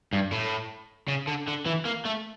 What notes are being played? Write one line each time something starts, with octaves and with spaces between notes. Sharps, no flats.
G2
A2
C#3
D3
D3
E3
A#3
A3